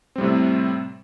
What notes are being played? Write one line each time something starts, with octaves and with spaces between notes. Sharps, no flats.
A2 C3 G3 C4